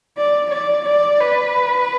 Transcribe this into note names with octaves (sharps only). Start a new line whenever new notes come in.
D5
D5
D5
B4